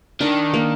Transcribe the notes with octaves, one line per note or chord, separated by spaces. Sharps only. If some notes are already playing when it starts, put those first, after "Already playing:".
D#3 D4
A#3